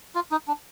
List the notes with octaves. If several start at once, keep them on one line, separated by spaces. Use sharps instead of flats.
F4
D#4
D4